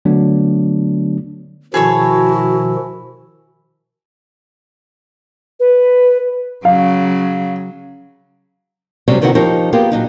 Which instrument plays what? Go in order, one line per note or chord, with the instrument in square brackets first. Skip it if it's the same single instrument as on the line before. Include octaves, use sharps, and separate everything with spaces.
[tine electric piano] D3 F#3 A3 B3 D4
[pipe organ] B2 D#3 F3 [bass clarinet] E4 [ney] F#4 [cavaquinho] G#4 A4 C#5
[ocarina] B4
[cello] C#3 F#3 [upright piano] F5
[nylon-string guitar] C3 F#3 G3 A3 C4 C#4
C3 D#3 E3 C4 D#4 F#4
F3 D#4 G4 A#4 C#5
A#3 B3 F4 G4 G#4 A#4
A#2 F#3 D#4